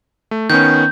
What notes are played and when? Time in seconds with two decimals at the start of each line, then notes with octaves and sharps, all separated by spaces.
0.31 A3
0.50 D#3 B3 C#4 G6